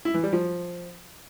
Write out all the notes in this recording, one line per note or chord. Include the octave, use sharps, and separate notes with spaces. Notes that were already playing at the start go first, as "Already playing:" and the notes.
E4
E3
G3
F3